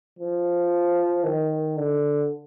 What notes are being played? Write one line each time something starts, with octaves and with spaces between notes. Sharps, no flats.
F3
D#3
D3